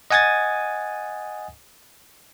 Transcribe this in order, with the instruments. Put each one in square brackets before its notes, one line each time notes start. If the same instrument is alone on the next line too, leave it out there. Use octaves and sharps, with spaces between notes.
[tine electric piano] D#5 F#5 G#5 D#6 G#6 A6